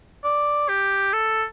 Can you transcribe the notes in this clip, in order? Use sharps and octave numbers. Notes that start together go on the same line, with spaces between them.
D5
G4
A4